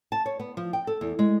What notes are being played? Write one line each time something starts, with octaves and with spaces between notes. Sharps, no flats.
A5
C#5
B3
F3
G5
A4
E2
G#3